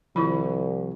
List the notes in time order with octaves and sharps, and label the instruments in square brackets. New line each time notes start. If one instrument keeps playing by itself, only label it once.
[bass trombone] C2 [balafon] D#3 E4 B5 [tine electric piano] F3